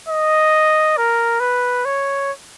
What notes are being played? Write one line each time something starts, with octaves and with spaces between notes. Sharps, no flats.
D#5
A#4
B4
C#5